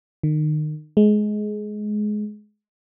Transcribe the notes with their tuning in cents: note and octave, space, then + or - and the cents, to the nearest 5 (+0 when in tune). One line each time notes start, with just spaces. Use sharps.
D#3 -30
G#3 +20